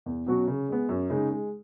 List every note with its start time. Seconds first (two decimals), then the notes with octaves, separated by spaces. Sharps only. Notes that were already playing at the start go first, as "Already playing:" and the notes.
0.06 E2
0.26 B2 F#3 C#4 F#4
0.48 C#3
0.69 G#3 B3
0.89 F#2
1.10 C#3 G#3 D#4
1.30 G#3